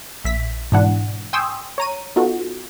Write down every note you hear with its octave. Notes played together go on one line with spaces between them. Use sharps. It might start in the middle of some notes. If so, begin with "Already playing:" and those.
A#1 E5 B6
G#2 B2 E3 D4 E4 F#5
G5 G#5 C6 C#6 D#6 E6
C#5 A#5 D#7
B3 D#4 F4 F#4 A4